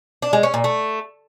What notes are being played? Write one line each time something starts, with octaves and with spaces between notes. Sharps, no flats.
D4
G#3
C#4
A#2
A3